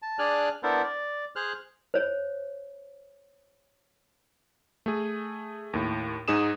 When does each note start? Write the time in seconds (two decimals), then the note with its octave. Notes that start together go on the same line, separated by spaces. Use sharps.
0.02 A5
0.19 D4 G#4 D5 G#5 F6 F#6
0.63 B3 D4 E4 A4 A#4 C5
0.84 D5
1.36 G#4 C5 F6 F#6
1.94 C5 C#5
4.86 A3 G#4
5.73 D#2 A2
6.28 G#2 D#4 G#4 D#6 E7